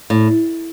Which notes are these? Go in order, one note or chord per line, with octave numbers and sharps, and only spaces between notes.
A2